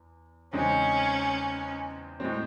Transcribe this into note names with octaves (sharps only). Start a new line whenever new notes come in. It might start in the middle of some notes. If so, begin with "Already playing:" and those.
Already playing: E2
E2 C#3 G#3 C4 C#4 D#4
A2 G#3 C4